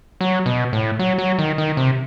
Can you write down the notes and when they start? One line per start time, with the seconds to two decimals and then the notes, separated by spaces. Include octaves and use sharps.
0.21 F#3
0.46 B2
0.73 A2
0.99 F#3
1.18 F#3
1.39 D#3
1.58 D#3
1.77 C3